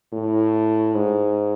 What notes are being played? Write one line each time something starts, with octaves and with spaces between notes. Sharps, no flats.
A2
G#2